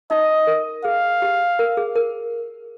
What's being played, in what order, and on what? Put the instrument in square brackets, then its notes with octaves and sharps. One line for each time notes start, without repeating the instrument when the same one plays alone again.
[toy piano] D#4 [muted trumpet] D#5
[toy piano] A#4
[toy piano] G#4 [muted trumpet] F5
[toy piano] G4
A#4
G#4
A#4